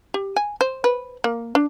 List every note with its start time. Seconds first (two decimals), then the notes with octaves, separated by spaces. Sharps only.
0.14 G4
0.36 G#5
0.61 C5
0.84 B4
1.24 A#3
1.55 D4